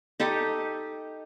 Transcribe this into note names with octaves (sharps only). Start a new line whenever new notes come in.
D#4 G4 A4 D#5